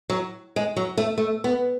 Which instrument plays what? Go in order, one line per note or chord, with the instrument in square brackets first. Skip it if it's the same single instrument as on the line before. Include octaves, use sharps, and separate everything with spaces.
[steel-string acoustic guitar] F#3
G#3
F#3
A3
A3
B3